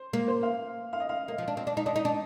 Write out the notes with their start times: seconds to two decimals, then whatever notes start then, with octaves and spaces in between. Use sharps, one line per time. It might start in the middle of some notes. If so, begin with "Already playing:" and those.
Already playing: C5
0.13 A#3
0.28 C5
0.43 F5
0.93 F5
1.00 D#5
1.09 F5
1.28 A#3 D#5
1.38 F3
1.48 D4
1.57 C4
1.67 D4
1.77 D#4
1.86 D4 D#5
1.96 D#4
2.05 D4